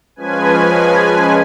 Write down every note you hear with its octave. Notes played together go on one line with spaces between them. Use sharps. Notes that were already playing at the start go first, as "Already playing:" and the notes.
F3 G#3 C#4 B4 G#5